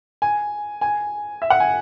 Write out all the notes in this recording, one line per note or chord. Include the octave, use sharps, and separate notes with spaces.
G#5
G#5
E5
F#5
G#5